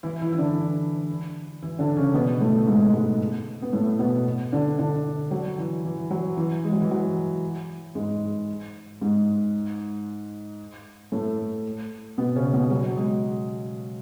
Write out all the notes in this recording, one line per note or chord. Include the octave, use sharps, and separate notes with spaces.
E3 E4
E3 E4
E4
D3 D4
E3 E4
D3 D4
C#3 C#4
B2 B3
A2 A3
G#2 G#3
G#2 G#3
B3
A2 A3
B2 B3
D3 D4
D3 D4
F#3
E3
E3
F#3
E3
G#3
F#3
E3
F#3
G#2 G#3
G#2 G#3
A2 A3
B2 B3
C#3 C#4
B2 B3
F#3 F#4
G#3 G#4